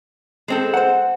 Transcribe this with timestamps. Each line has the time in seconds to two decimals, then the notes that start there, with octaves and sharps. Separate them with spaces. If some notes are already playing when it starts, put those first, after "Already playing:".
0.48 G#3 C4 A4
0.74 C5 F#5